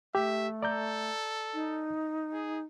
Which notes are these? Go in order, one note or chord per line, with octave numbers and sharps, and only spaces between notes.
A3 G4 E5
A4 D5 A#5 G6
D#4
G#4